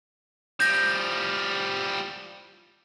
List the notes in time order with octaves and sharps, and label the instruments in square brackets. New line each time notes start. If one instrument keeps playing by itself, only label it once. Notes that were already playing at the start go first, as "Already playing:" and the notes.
[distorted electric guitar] F3 G3 [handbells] G6 A#6